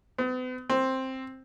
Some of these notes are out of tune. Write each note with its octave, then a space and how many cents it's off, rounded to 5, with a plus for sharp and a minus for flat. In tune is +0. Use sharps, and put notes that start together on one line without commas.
B3 +45
C4 +5